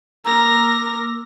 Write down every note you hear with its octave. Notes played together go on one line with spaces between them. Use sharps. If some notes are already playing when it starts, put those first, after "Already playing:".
A#3 A#4 A#5 D6 E6 A#6